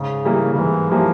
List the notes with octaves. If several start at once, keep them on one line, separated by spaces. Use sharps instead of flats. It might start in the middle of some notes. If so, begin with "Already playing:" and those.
Already playing: G#2 C#3
E3 G3 A#3
C#3
G#2 E3
E3 F3 G3 A#3